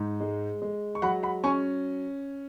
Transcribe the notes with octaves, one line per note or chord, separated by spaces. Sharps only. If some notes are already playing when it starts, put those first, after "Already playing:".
Already playing: G#2
G#3
G#3
C#6
F#3 F#5 B5
F#5 B5
C#4 G#5 C#6